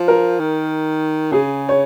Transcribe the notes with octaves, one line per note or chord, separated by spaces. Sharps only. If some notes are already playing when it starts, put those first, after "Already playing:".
Already playing: F3
A#4
D#3
C#3 G#4
C#5